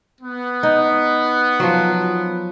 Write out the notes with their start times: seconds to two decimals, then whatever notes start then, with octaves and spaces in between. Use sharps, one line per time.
0.22 B3
0.63 D#4
1.60 F3 F#3